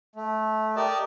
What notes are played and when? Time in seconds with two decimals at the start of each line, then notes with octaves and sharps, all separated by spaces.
0.16 A3
0.76 G4 A#4 D5 D#5 A5